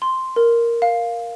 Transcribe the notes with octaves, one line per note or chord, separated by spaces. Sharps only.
C6
A#4
F5